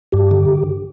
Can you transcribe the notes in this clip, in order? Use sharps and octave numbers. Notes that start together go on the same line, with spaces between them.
G2 G4
D3